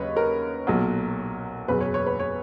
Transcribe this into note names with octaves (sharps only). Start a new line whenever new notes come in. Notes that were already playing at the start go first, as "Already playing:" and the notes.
Already playing: D#2 C#3 F#3 B4 C#5 D#5
A#4
B1 A#2 F#3
F#1 E2 B2 F#3 B4
C#5
C#5
B4
C#5